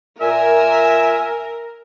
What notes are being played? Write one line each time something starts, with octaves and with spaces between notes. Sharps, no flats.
A#2 A#4 E5 G#5